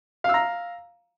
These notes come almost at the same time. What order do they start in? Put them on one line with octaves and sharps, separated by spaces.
F5 E6 A#5